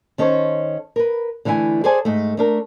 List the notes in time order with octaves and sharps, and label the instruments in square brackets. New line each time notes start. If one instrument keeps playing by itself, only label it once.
[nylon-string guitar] D#3 C#4 A4 C5 C#5
A#4 B4
D3 E3 A3 E4 G#5
G#4 A4 C5 D5 G#5
G#2 A3
A3 D4 A#4